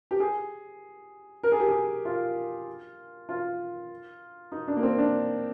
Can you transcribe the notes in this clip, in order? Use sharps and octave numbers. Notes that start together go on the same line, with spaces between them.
G4
G#4
A#4
G#4
G4
G#4
F4
F4
D#4
D4
A#3
C4
D4